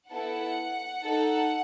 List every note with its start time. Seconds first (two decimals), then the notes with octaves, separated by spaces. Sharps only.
0.10 B3 E4 A4 F#5
1.04 D#4 A4